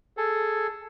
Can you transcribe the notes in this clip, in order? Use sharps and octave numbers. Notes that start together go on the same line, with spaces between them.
G#4 A4